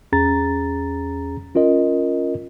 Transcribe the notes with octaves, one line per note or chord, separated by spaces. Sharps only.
E2 C#4 G#4 A#5 A6
C#4 F4 A#4 D#5